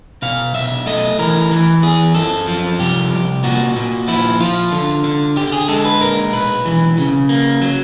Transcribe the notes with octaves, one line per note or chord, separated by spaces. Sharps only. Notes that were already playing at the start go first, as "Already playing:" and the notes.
B2 F5
B1 E5
A3 D#5
E3 A#4
E3
E2 G#4
F#2 A4
F3
C2 G4
C2
A#2 F#4
A#2
F3 E4
F3 F4
D3
D3
D3 G4
G#4
G#3 A4
B4
A#2 A#4
B1 B4
E3
C#3
A#3
F#3